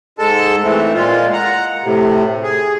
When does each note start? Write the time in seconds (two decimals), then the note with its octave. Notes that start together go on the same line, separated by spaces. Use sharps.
0.19 G#2 G#3 A4 A5
0.64 E3 A3 C4
0.94 A#2 G#3 F4
1.33 F#5 A#5
1.84 A2 C3
2.43 G#4